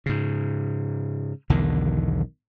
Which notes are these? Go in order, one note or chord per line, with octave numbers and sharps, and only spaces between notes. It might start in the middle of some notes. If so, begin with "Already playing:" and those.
G#2 C#3
B1 E2 D3 D#3